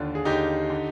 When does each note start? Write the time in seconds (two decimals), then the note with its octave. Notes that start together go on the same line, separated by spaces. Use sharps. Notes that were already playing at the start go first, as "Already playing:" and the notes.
Already playing: D#2 D3 D4 F4
0.15 G#4
0.25 D#2 D3 D#4 G4
0.70 D3